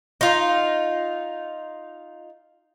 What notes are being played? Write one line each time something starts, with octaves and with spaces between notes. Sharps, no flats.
D#4 F4